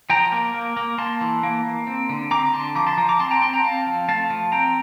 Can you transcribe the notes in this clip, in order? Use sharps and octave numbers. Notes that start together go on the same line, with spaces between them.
F3 G5 A#5
A#3
A#3
A#3
A#3 A5 C6
E3
A#3
A#3
C4
D3
C4 A#5 D6
D3 A5 C6
F3 A#5 D6
A5 C6
F3 A#5 D6
A#5 D6
C4 A5 C6
G5 A#5
C4 A5 C6
G5 A#5
C4 F5 A5
F3
A3 F5 A5
F3
C4 G5 A#5